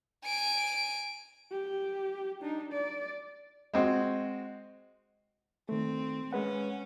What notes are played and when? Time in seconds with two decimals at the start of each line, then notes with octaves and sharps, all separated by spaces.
0.25 G#5 D7
1.52 G4
2.42 D4 D#4
2.73 D5
3.74 G#3 C4 F#4
5.69 D#3 A3 C4
6.33 G#3 C#4 B4 F#5